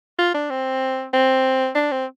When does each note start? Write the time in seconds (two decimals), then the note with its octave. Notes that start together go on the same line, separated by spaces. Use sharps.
0.19 F4
0.34 D4
0.50 C4
1.13 C4
1.75 D4
1.91 C4